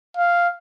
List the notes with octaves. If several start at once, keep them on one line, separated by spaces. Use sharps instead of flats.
F5